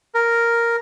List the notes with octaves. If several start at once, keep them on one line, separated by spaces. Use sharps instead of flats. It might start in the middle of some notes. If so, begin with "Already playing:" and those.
A#4